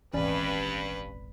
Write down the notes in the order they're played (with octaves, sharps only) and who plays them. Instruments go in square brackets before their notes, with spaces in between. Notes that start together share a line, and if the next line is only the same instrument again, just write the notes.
[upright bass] D#1 G#1 [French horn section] G2 [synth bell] E3 C#4 D5 [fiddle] B4